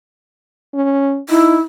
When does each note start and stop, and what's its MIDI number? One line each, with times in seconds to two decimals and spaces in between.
0.74 1.20 61
1.29 1.57 63
1.29 1.61 64